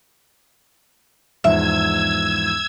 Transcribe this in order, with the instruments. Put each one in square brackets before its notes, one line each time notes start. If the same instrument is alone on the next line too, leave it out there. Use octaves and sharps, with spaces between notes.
[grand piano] E2 G#2 F3 [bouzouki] E5 [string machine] E6 G#6